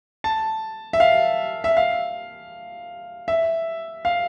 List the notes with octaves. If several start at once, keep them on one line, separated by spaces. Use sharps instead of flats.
A5
E5
F5
E5
F5
E5
F5